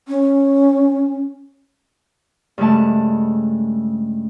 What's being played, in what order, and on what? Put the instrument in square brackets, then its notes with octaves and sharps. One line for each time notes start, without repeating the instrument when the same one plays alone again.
[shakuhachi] C#4
[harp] G2 C#3 G#3 A3 A5